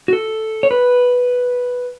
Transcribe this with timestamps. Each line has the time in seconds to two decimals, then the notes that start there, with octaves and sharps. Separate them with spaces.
0.08 F#4
0.13 A4
0.63 C#5
0.71 B4